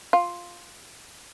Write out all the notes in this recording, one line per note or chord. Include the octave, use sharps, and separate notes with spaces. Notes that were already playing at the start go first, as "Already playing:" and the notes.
F4